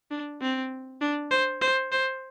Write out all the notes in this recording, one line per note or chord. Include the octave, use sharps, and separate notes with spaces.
D4
C4
D4
C5
C5
C5